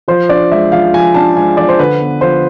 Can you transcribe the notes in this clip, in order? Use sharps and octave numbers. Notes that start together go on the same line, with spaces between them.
F3 C5
D4 D5
G#3 E5
F3 F5
F3 G#5
D4 A5
G#3 G#5
F3 D5
C5
D3 B4
B3
F3 C5